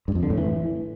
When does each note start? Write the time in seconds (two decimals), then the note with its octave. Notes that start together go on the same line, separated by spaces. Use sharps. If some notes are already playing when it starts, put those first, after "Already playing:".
0.08 G2
0.15 F2
0.23 D3
0.30 A2
0.38 E3